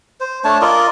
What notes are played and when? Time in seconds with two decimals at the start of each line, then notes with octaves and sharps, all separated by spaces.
0.20 C5
0.44 A3 D4 C#5 A5
0.61 F4 A#4 D5 D#5